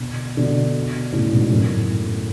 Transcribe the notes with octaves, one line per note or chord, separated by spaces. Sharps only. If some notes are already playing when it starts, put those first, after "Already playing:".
Already playing: B2 D3
B2 D3
A2 C#3
G#2 B2
F#2 A2